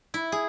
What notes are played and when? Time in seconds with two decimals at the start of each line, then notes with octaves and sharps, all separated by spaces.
0.14 E4
0.32 G#4